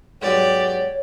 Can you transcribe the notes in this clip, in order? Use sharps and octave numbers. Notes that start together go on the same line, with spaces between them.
G#2 B2 F#3 G4 C#5 D5